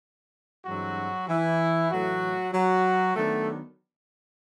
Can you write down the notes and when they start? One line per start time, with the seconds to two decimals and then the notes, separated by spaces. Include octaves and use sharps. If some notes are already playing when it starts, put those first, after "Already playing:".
0.65 G2 E3 F#3 G#3 C4 F#4
1.28 E3 E4
1.90 A2 E3 F#3 A3 F#4
2.53 F#3 F#4
3.15 D#3 F#3 A3 B3 D4 A4